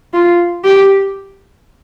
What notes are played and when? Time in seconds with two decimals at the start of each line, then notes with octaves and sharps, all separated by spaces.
0.14 F4
0.65 G4